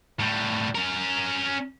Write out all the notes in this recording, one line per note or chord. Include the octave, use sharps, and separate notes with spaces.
A2 G3
C#4 A#4